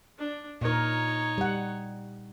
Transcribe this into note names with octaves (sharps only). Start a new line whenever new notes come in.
D4
A#2 D#4 A#4 C#5
G3 F#5